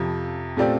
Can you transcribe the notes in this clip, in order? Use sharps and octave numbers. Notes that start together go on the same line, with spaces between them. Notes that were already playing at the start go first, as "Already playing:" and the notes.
Already playing: F2 C3 F3
A#2 A3 C4 G4 D5